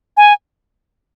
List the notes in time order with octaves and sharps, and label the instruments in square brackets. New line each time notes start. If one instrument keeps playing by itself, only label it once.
[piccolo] G#5